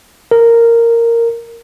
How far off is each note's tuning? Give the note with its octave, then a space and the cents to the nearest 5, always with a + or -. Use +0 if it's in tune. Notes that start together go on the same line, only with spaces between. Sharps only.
A#4 -10